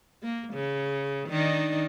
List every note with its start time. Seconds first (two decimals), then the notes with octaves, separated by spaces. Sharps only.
0.23 A#3
0.54 C#3
1.29 D#3 D4 D#4